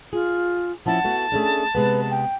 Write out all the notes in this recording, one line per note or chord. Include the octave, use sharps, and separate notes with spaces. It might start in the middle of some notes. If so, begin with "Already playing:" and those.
F4 G#4
F3 C#4 E4 F#5 A5
A3 B3 F#4
A3 C#4 D4 G#4
C3 G#3 B3 B4
G5